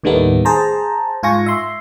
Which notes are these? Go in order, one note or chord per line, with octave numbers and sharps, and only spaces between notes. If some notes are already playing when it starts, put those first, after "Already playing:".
D#2 A2 D#3 G3 A3 B3
G#4 C5 A5 A#5
G#2 F4 G#5 C#6 A#6
E5 C6